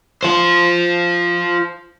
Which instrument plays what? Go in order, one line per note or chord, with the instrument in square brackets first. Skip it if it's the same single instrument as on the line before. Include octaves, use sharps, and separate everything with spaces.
[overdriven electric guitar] F4 C5